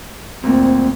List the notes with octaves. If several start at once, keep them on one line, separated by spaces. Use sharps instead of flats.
D2 A#2 C4